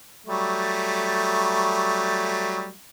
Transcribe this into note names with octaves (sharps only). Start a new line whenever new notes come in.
F#3 G3 A3